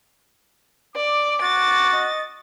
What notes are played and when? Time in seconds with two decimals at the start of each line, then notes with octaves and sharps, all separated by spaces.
0.96 D5 D6
1.42 F#4 A6
1.93 D#5